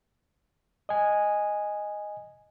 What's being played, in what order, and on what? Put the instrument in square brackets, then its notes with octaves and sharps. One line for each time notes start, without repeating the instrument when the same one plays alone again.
[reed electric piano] D#5 G#5